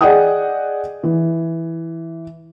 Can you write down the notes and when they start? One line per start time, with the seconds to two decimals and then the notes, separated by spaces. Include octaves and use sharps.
0.01 G#4 D5 D#5 F#5 G5 D#6
1.03 E3